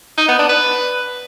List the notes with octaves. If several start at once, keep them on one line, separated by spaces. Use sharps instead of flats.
D#4
B3
D4
B4